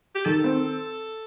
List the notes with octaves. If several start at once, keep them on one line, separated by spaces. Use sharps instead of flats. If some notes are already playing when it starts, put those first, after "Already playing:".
G4
D#3 A4
C4